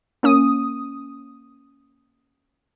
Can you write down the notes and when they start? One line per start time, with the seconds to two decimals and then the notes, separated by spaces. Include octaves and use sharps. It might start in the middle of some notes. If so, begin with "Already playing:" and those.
0.23 A#3 C#4 D#6